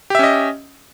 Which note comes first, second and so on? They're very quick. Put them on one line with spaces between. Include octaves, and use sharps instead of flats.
G4 E5 C#4 D#5